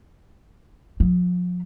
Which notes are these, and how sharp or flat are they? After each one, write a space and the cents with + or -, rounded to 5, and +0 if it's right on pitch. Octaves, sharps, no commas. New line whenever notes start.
F3 +40